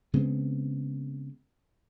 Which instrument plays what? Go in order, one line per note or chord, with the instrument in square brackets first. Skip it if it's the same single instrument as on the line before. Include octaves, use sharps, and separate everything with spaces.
[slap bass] C#3 G#3 B3 C4